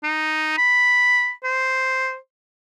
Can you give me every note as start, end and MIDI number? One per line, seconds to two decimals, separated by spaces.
0.03 0.58 63
0.58 1.32 83
1.44 2.16 72